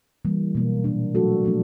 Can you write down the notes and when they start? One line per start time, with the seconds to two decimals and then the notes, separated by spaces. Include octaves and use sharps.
0.25 E3 G3 A#3
0.55 B2 F#3 A#3
0.84 A#2 G3 A#3 D4
1.15 F#3 A3 D4 F#4 A4
1.44 F3 A3 D4